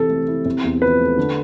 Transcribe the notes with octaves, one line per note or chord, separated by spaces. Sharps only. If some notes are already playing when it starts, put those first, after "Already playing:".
Already playing: C3 E3 A4
A3
E4
C3
E2
F3 B4
A3
D3